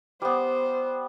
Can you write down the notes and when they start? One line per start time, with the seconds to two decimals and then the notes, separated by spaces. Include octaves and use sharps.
0.22 G3 B3 C5